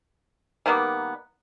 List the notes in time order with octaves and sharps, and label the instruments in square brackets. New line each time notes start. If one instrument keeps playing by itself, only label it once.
[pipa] D#3 G3 A#3 B3